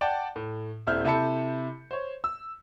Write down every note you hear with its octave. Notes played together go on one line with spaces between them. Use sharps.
D5 F#5 G5 A5
A2
D#1 C4 E4 F6 G6
C3 E4 A4 A5 B5 C#7
C5 C#5
E6